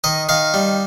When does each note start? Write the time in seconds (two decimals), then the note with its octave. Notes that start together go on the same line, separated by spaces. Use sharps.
0.04 D#3 D#5
0.29 D#3 F5
0.54 G3